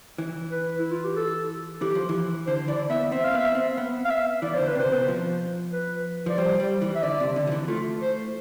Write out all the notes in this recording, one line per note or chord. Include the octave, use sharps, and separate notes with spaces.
E3
B4
E4
F4
G4
A4
E3 G4
F3
E3
D3 C5
E3 D5
B3 E5
C4 E5
F5
B3 E5
C4
B3
F5
E5
E3 D5
D3 C5
B4
C3 C5
B2
F3
B4
F3 D5
G3 C5
G3
E3
E5
D3 D5
C3
D3
F3
E3
A3 F4
C5